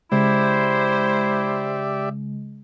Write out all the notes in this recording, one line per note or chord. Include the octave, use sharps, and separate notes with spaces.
C#3 G#3 E4 G4 C5 D5 E5